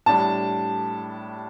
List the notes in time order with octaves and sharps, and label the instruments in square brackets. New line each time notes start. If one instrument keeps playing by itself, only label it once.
[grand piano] A2 G3 D4 [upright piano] A5